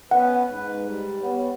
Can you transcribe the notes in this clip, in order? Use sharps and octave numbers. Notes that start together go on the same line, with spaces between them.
B3 C#4 B4 F#5
G#2 B4
G3
B3 C#5